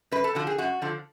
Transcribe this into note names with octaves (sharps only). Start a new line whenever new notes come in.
F#2 B4
A4
D3 F3 F#4
G#4
F#2 F#4
D3 F3